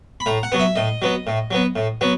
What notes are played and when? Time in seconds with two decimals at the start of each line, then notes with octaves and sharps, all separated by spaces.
0.20 B5
0.26 A2 A#5
0.43 F#5
0.52 F#3 B3
0.60 E5
0.76 A2 D#5
1.02 F#3 B3
1.27 A2
1.51 F#3 B3
1.76 A2
2.01 F#3 B3